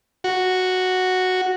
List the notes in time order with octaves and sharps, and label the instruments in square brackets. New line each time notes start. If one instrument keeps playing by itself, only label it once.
[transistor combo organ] F#4